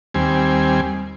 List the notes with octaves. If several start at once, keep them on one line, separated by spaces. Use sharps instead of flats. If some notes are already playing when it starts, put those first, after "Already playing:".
D#2 G3 C4 G#5